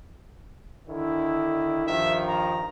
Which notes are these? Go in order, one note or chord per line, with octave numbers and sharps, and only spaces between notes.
D3 D#3 E4
G2 D#3 F3 E5
A#5